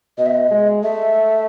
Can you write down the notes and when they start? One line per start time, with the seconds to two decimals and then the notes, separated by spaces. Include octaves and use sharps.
0.18 B2 D#5
0.26 E5
0.34 D#5
0.51 G#3
0.83 A3 E5